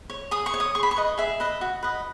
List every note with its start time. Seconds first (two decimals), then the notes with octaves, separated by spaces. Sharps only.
0.10 C#5
0.31 G#4 D#6
0.46 C#6
0.54 C#5
0.60 D#6
0.75 G#4 C#6
0.83 B5
0.91 C#6
0.97 B4 D#5
1.18 G#4 E5
1.40 B4 D#5
1.61 F#4
1.83 B4 D#5